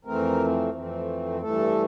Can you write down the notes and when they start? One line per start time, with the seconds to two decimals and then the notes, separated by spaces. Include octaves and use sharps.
0.05 F2 E3 A3 C4 A#4
0.73 F2 E3 A3 C4
1.41 G2 E3 A3 A4